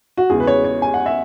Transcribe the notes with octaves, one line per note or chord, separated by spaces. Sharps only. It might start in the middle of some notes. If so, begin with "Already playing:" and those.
F#4
E2 C#3 G#3 G#4
B4
C#5
C#5
G#5
F#5
E5